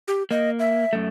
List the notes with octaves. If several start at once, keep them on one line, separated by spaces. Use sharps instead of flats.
G4
A#3 D#5
E5
F#2 A3